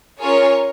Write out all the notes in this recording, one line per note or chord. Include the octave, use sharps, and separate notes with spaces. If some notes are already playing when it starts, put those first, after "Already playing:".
C#4 F4 G#4 A#4 C#5